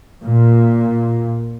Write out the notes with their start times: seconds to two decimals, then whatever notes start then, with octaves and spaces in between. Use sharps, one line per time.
0.24 A#2